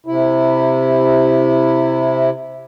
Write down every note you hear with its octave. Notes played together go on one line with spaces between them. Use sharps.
C3 E4